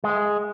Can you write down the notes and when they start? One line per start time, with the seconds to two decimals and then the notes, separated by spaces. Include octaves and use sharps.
0.04 G#3